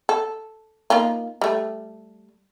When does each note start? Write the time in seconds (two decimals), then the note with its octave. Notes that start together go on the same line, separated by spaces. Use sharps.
0.09 A4
0.90 A#3 D#4 F4
1.41 G3 A3